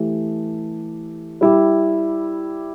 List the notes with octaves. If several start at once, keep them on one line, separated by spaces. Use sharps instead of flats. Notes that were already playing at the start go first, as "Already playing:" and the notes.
Already playing: E3 A3 G4
G3 E4 G4